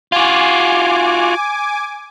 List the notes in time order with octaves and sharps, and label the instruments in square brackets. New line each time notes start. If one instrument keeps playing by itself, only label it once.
[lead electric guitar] F4 F#4 [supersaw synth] G#5 D6